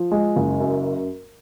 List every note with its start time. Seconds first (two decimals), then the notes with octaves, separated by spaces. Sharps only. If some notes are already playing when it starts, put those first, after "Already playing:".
Already playing: F3
0.11 G#3
0.36 F#1
0.60 F#2